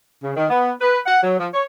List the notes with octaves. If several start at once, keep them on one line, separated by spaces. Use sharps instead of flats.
C#3
D#3
B3
B4
F#5
F#3
F3
C#5